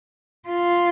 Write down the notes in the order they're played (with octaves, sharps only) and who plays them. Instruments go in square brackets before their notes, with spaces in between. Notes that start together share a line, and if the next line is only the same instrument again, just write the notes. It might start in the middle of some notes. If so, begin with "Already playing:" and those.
[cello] F4